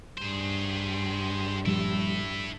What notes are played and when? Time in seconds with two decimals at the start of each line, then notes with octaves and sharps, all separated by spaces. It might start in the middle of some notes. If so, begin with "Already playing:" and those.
0.18 G2 G#4 C5
1.65 A#2 F3 G3 E4 A4